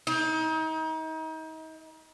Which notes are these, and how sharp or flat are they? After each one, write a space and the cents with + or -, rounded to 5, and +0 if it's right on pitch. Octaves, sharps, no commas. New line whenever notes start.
D#4 +35